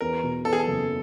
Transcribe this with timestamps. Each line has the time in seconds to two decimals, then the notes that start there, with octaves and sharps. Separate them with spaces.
0.01 E2 A#4
0.23 B2
0.45 E2 A4
0.53 G#4
0.59 A4
0.67 F#1